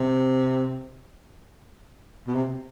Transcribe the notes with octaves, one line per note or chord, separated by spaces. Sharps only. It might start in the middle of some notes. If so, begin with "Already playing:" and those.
Already playing: C3
B2
C3